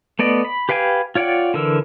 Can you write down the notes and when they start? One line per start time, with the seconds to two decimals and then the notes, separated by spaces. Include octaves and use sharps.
0.19 A3 B3 D5 D#5
0.45 B5
0.69 G4 B4 F5 G5 G#5
1.15 F4 C#5 D5 F#5 G5
1.54 D3 E3 A#4 E6